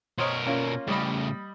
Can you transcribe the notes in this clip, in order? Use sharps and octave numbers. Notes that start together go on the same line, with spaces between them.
B2 A#4 C5 C#5 D#5
A#3 C#4 F4
A2 C#3 G3 D#5 B5